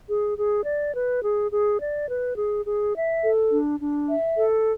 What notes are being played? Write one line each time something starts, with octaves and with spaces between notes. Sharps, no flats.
G#4
G#4
D5
B4
G#4
G#4
D5
B4
G#4
G#4
E5
A4
D4
D4
E5
A4